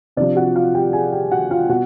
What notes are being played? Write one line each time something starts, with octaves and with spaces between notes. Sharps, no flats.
C3 F3 D4 D5
F#4 F#5
F4 F5
G4 G5
G#4 G#5
G4 G5
F#4 F#5
F4 F5
B2 F#4 F#5